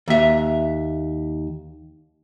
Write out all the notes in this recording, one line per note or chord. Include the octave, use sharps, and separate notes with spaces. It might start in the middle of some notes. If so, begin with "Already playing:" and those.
D#2 E5